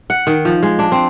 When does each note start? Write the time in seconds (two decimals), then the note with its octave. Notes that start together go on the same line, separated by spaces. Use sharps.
0.10 F#5
0.27 D#3
0.45 F3
0.63 G#3
0.79 D4
0.92 C4